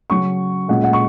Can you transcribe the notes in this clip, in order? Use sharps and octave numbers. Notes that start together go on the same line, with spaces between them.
C#3 F#3 C#4 C#6
A#2 G#3 C#4 F#5
F#5
C#6